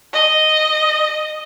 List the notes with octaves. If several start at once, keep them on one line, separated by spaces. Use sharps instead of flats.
D#5